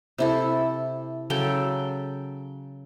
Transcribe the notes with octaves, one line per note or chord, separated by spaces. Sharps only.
C3 E4 A4
C#3 F#3 A4 G5